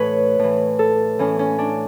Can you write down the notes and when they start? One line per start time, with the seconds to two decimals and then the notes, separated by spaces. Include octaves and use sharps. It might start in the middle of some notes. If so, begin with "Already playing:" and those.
Already playing: A2 E3 B4 C#5
0.39 A2 E3
0.79 A4
1.19 A2 E3 C#4
1.39 C#4
1.58 D4